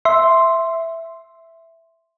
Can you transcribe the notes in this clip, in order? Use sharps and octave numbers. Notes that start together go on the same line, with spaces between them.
E5 C6